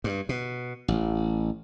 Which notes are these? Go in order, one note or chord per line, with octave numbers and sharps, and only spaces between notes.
G2
B2
A1